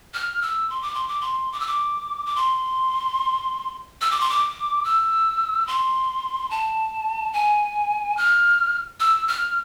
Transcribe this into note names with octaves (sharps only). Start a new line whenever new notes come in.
F6
E6
C6
D6
C6
D6
C6
D6
E6
D6
D6
C6
E6
D6
C6
D6
E6
C6
A5
G#5
F6
E6
F6